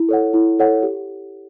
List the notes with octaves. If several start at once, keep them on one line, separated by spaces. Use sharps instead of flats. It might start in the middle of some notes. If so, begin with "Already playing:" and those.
Already playing: E4
A4 C#5 F#5
E4
A4 C#5 F#5
G4